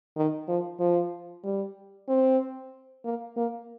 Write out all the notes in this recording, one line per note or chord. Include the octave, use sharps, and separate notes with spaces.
D#3
F3
F3
G3
C4
A#3
A#3